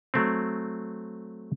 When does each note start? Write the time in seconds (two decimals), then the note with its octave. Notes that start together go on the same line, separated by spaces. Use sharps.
0.14 F#3 A3 C4